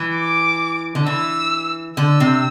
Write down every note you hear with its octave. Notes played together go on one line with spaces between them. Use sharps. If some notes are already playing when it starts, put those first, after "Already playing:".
Already playing: E3
D6
D3
E3 E6
D3 E6
C3